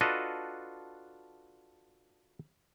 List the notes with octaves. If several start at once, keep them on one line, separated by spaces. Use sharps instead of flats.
D4 F4 F#4 A4 B4 D#5